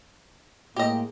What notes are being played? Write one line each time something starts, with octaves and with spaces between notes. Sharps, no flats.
A2 G#3 A#3 G4 D#5